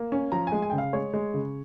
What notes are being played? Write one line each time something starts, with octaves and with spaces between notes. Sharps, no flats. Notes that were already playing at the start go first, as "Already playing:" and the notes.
Already playing: A#3
C#4
F3 A#5
G#3 G#5
G#5
C#3 G5
F5
G#3 C#5
G#3
C#3